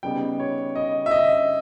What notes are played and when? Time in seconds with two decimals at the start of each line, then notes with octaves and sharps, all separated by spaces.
0.03 C#3 G3 B3 D#4 G5
0.39 C#5
0.76 D#5
1.06 E5
1.11 D#5